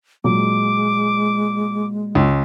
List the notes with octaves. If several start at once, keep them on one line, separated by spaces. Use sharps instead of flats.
A#2 F#3 G#3 D6
C#2